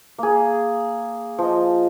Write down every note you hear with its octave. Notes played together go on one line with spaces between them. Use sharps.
A#3 G#4
F3 D#5